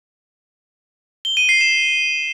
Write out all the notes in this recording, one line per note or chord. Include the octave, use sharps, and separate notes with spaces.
G7
D#7
C7
E7